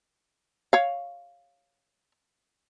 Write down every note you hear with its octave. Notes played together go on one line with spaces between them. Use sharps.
C#5 F5